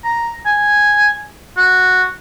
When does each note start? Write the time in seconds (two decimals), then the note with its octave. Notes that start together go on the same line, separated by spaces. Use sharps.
0.05 A#5
0.46 G#5
1.57 F#4